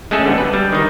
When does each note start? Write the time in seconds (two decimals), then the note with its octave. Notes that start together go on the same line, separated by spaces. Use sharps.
0.11 G#3 A3 C#4 G#4 A4
0.25 D3 G3 B3
0.38 B4
0.53 G3
0.72 D#3 D#4